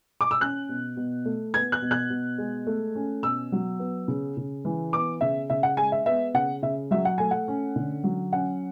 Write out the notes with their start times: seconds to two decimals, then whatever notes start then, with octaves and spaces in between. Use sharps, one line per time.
0.21 D6
0.31 E6
0.40 C#4 F#6
0.69 B2
0.97 B2
1.25 A3
1.54 B3 G#6
1.72 F#6
1.82 B2
1.91 F#6
2.10 B2
2.38 G#3
2.67 A3
2.95 C#4
3.23 B2 E6
3.52 F#3
3.79 B3
4.08 C#3
4.37 C#3
4.65 E3
4.93 B3 D6
5.21 C#3 E5
5.50 C#3 E5
5.63 F#5
5.77 G#3 G#5
5.92 E5
6.06 B3 E5
6.34 C#3 F#5
6.62 C#3 E5
6.91 F#3 E5
7.05 F#5
7.18 A3 G#5
7.31 F#5
7.48 C#4
7.76 D3
8.04 F#3
8.32 C#4 F#5